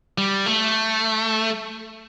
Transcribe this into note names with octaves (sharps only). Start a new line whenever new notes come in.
G3
A3